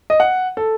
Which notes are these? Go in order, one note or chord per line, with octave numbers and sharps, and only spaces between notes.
D#5
F#5
A4